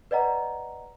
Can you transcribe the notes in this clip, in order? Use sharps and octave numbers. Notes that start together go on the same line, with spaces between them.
B4 D5 D#5 F#5 A#5